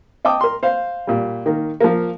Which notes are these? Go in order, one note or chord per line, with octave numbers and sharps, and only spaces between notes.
D#5 G5 A5 D6 D#6
A#4 C6
C5 F5
A#2 G3
D#3 A#3
F3 A#3